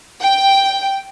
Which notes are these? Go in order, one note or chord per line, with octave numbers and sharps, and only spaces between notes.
G5